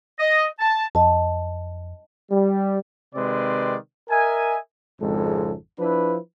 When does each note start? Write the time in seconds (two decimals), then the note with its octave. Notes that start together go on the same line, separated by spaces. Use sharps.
0.18 D#5
0.59 A5
0.95 F2 D#5 A5
2.31 G3
3.15 C3 D#3 G#3 C4 B4 D5
4.10 A#4 D#5 E5 G#5
5.01 G#1 F2 C#3 G#3 A4
5.79 F3 D4 E4 B4